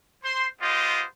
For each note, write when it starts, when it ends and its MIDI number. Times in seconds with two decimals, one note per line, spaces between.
0.23 0.46 72
0.23 0.46 84
0.61 1.04 56
0.61 1.04 59
0.61 1.04 65
0.61 1.04 67
0.61 1.04 72
0.61 1.04 75